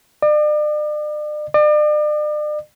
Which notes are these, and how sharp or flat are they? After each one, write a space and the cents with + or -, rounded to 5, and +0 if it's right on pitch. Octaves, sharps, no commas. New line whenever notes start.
D5 +40
D5 +40